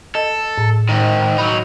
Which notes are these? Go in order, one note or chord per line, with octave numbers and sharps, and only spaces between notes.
A4 D#5
A2
G#2 D#3
F#3 D#4 B5